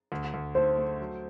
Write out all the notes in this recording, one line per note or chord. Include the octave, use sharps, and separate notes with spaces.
D2
D2
A3 C5
A3
F#3